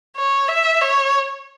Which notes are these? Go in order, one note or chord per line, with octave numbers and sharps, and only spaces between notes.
C#5
E5
C#5